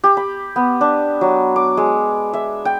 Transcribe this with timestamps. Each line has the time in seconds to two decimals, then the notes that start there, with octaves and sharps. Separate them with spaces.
0.04 G4
0.17 B5
0.56 B3
0.81 D4
1.21 F#3
1.56 D6
1.77 G#3
2.33 E5
2.65 G5